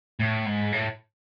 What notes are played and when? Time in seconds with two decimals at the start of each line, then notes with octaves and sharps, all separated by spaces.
0.19 A2
0.45 G#2
0.72 A2